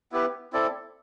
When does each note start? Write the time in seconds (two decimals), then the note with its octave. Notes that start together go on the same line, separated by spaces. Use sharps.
0.12 B3 E4 G4 B4
0.53 C4 E4 A4 D5